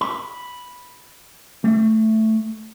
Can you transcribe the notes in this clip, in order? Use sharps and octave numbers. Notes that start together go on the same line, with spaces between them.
B5
A3